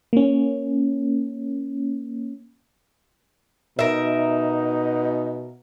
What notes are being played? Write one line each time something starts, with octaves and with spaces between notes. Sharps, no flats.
A#3 C#4
B2 D#4 A#4 E5